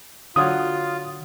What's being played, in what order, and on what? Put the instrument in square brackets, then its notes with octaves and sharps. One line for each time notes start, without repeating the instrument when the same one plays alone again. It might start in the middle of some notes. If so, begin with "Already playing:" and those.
[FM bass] D3 [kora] F#3 F#4 C#5 [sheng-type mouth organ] F4 [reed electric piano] D#6